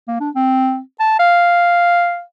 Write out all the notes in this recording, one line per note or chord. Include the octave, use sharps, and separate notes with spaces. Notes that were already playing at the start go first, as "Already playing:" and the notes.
A#3
D4
C4
A5
F5